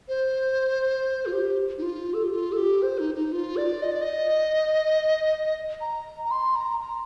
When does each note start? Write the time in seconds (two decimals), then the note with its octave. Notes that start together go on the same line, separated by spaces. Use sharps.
0.09 C5
1.26 F4
1.33 G4
1.78 D#4
1.82 F4
2.14 A4
2.24 G4
2.32 F4
2.52 A4
2.57 G4
2.82 C5
2.99 D#4
3.15 D#4
3.32 F4
3.57 D5
3.82 D#5
3.92 D5
4.01 D#5
5.81 A#5
6.25 A#5
6.31 C6
6.56 A#5
6.80 A#5